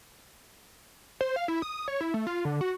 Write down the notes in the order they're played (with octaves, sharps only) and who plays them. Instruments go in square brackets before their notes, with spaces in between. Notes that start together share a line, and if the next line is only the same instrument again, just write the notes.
[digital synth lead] C5
F5
E4
D#6
C#5
E4
A3
F4
D3
F#4